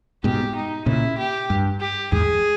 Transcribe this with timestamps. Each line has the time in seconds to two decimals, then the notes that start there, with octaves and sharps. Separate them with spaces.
0.24 G#2 B2 G4
0.55 D#4
0.86 A#2 C#3 E4
1.18 G4
1.50 G2
1.81 G4
2.12 E2 G#2 G#4